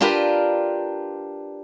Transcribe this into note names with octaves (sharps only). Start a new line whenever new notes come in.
D4 F4 G4 A#4 B4